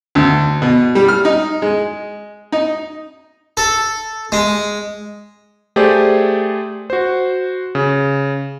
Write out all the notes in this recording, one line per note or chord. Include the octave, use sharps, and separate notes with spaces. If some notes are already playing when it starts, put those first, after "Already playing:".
D2
B2
G3
F6
D#4
G#3
D#4
A4
G#3
A3 G4 G#4 C5 D5
F#4 C5
C#3